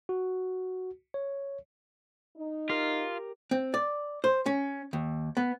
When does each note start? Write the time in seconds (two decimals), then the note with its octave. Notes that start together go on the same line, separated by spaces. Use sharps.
0.09 F#4
1.14 C#5
2.37 D#4
2.70 F4 G4 A#4
3.51 C4
3.74 D5
4.24 C5
4.46 C#4
4.93 D#2
5.37 B3